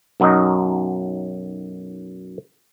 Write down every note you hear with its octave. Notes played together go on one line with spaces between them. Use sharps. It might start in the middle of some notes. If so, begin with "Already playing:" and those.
B1 F#2 F#3 D#4 D#5